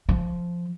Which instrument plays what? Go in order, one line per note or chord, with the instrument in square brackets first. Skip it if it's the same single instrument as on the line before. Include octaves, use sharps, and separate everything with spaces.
[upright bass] F3